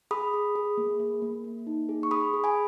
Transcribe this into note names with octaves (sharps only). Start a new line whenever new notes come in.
G#4 B5 D#6
G#4
G#4
A#3
A#3
A#3
A#3
D#4
G#4
C#6
G#4 B5 D#6
G#4
G#5 B5